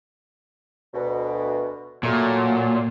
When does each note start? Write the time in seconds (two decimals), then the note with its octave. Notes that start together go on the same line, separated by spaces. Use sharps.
0.94 D2 B2
2.03 A#2 F#3 A3